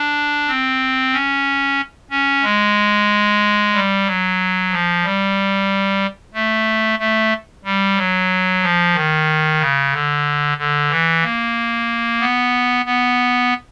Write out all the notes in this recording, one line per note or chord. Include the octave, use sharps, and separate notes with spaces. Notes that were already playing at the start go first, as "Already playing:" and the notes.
Already playing: D4
C4
C#4
C#4
G#3
G3
F#3
F3
G3
A3
A3
G3
F#3
F3
D#3
C#3
D3
D3
E3
A#3
B3
B3